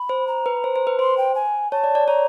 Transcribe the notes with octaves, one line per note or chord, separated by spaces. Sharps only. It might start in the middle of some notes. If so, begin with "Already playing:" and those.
Already playing: B5
C5
A#5
B4
C5
C5
B4
C5 C6
G5
G#5
C#5 A5
D5
D5
C#5 A#5